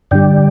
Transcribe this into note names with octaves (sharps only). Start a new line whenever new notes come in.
G2 D3 G3 D5 G5